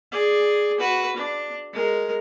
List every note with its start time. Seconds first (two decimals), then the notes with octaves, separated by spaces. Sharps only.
0.12 G#4 D5
0.79 F#4 B4
1.16 D4
1.73 G#3 A#4